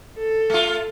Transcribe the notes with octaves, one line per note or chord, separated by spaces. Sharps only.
A4
A3 F4